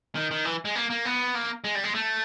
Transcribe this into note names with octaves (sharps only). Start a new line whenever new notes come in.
D#3
D#3
E3
G#3
A#3
A#3
B3
A#3
G#3
G3
G#3
A3